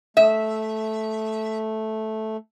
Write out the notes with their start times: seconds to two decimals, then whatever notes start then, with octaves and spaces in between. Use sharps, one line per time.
0.17 A3 E5